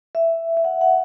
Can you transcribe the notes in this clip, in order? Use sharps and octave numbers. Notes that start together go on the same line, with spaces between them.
E5
E5
F#5
F#5